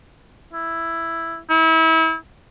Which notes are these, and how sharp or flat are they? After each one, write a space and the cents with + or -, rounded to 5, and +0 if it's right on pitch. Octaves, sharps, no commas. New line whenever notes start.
E4 +5
E4 -35